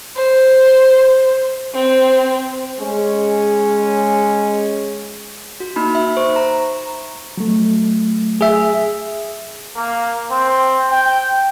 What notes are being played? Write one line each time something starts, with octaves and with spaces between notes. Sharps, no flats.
C5
C4
G#3 C#4
F#4
A#3 D#4 B5
E5
C5 C#6
A#5
F#3 A3
G#4 E5
A#3
C4
G5